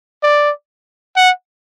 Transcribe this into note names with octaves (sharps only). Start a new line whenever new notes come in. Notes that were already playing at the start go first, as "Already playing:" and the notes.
D5
F#5